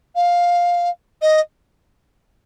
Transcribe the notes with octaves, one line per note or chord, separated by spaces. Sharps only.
F5
D#5